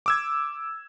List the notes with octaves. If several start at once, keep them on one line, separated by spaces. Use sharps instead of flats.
D6 E6 G#6